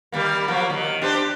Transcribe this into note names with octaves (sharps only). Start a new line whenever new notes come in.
D#3 G3 A#3
F3 F#3 A#3
D#3
D4 G4 C5